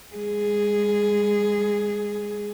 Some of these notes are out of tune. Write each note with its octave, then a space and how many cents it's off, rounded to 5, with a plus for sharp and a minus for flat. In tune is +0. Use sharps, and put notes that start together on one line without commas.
G#3 -30 G#4 +0